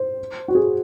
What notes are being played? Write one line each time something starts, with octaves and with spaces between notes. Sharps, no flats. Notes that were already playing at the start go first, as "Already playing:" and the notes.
Already playing: C5
F#4
G#4